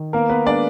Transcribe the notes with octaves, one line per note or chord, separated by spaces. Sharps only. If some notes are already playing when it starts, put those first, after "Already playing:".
Already playing: D#3
A#3 B3 A#4
B3 B4
G#3 D4 D5